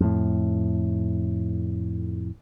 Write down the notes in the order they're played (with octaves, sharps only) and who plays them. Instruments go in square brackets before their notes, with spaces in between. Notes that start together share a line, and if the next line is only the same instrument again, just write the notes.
[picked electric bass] F2 A2